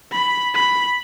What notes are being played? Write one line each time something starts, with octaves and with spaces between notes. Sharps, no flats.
B5
B5